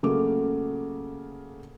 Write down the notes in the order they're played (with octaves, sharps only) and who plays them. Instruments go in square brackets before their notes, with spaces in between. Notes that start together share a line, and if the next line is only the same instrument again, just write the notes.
[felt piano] C#3 F#3 A3 A#3 D6